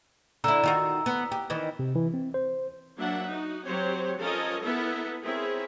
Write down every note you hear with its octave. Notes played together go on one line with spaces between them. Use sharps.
D3 E4 A#5 E6
D#3 F4 F#4
B3
G4
D#3 E3
C3
E3
C4
C5
F#3 A#3 D4 E5 F#5
D#4 F#4
F#3 C4 G4 C5 C#5
F3 C#4 A4 A#4 C#5 D#5
B3 E4 A4 A#4 E5
C4 E4 G#4 A#4 C#5 E5